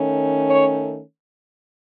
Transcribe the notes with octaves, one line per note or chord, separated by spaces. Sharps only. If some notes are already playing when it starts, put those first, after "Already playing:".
Already playing: D#3 A3 C#4
C#5